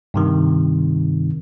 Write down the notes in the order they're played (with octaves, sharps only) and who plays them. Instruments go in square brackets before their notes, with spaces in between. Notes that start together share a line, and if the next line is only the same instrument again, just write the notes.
[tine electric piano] G2 C3 D#3